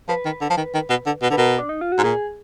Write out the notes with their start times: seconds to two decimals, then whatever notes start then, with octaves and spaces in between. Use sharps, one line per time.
0.09 F3 B4
0.25 D#3
0.41 D3
0.50 F3
0.57 D#3
0.74 D#3
0.90 B2
1.06 D3
1.22 B2
1.30 D3 B4
1.38 B2 A#4
1.59 D4
1.69 D#4
1.81 F4
1.92 F#4
1.98 G#2
2.03 A#2 G#4